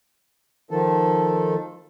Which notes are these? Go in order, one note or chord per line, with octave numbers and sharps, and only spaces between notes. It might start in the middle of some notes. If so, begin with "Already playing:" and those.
D#3 F3 A4